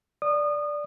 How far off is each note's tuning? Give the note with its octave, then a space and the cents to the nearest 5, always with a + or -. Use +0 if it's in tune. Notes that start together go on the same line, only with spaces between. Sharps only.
D5 +0 D#6 -30